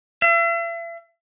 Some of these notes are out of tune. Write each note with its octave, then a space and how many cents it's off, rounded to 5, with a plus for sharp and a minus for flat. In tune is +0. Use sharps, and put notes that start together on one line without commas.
E5 +40